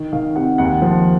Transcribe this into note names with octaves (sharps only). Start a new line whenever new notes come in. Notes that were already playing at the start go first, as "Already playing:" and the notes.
Already playing: D#3
D#3 F5
C3 F#5
D#2 F#5
F3